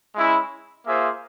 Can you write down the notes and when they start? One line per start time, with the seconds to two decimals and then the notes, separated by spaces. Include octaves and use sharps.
0.15 G#3 C#4 E4
0.85 A#3 F4 G#4 C5 E5